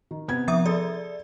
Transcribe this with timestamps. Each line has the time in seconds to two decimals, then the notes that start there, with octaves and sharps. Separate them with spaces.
0.11 D#3
0.28 C3 B3 G#6
0.48 F3 E5 D#6
0.66 G#4 A4 D5